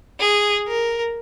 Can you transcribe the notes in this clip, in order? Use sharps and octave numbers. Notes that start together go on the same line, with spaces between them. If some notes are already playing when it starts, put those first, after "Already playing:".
G#4
A#4